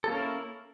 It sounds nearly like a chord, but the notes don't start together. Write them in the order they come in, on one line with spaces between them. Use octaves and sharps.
A4 A#3 C#4 A#4 E4